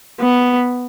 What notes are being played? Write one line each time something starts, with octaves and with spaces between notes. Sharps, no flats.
B3